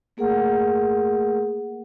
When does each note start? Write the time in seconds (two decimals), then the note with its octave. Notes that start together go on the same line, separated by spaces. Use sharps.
0.17 A3 A#3 G#4 A#4 F#5